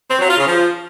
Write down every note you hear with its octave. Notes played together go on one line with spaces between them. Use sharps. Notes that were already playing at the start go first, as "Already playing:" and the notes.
C4
F#3
F4
C#3
F3